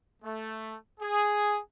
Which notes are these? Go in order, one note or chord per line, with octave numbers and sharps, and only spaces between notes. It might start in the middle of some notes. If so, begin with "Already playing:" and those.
A3
G#4